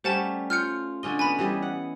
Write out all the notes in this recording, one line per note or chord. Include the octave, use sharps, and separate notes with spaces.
G3 A3 C#4 C5 F#5 A5
F4 F6 G6 C#7
D3 C#4 D#5 G7
B3 B4 G#5 B5
E3 G3 D#5
F#5